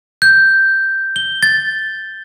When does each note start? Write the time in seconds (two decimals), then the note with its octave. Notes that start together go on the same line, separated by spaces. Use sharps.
0.22 G6
1.16 G7
1.43 A6